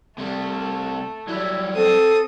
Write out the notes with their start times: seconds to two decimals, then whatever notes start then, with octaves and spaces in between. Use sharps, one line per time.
0.18 C3 G3 A3
1.28 F#3 G3 E4
1.74 C4 A4 D#6